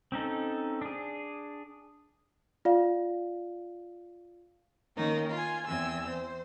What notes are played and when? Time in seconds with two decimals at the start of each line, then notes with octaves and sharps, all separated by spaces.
0.12 C4 C#4 D#4 A4
0.82 D4 G#4
2.65 F4 D5 F5
4.97 D#3 A#3 C#4 D#4 A#4
5.31 F4 G#5
5.67 E2 C4 G#5 E6
6.08 C5